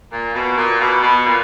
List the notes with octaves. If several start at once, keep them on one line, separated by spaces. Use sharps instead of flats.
A#2
B2
A#2
B2
B2
A#2